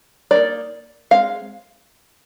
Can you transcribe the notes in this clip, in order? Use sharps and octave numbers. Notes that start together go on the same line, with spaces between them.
G3 A#3 D#4 D5
G#3 C4 F5